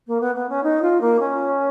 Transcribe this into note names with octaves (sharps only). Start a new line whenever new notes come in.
A#3
B3
B3
C#4
D#4
F4
A#3
C#4